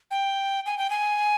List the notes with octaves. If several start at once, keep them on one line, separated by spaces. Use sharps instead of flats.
G5
G#5
G5
G#5